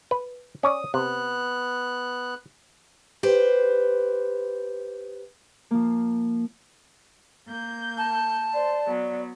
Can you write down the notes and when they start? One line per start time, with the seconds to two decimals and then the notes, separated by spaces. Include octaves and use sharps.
0.11 B4
0.63 C#4 C#5 D5 D#6
0.94 C3 B3 F#6
3.23 G4 B4 C5
5.71 F3 A#3
7.47 A#3 G6
7.98 A5
8.54 C5 D5
8.87 F#3 B3